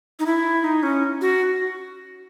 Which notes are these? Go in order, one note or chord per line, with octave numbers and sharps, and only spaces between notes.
D#4
E4
D#4
C#4
F#4